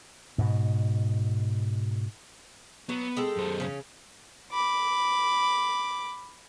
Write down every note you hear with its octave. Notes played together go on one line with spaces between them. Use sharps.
G#2 B2
F#3 B3
G#3 G4 A4
F#2 C5
C#3 C#4
B5 D6